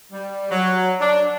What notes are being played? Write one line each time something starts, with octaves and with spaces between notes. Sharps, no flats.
G3
F#3
D4